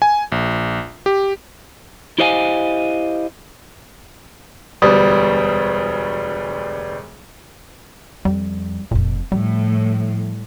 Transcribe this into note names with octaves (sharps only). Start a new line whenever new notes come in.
G#5
A#1
G4
E4 G4 C5 D#5 F5 G#5
E1 D2 G3 B3 D#6
F2 G3
F1 F2 A#2
A2 F3 G3